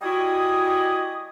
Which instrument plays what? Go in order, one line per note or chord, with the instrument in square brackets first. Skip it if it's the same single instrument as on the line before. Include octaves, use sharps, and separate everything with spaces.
[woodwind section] G3 E4 F#4 D#5 G#5 D#6